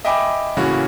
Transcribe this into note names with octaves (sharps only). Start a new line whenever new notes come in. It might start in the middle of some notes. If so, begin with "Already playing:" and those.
D#5 E5 G5 G#5 B5 D6
A2 C#3 E3 A#3 C#4 F#4